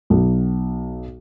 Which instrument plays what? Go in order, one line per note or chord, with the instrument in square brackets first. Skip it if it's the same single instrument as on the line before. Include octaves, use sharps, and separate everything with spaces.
[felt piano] B1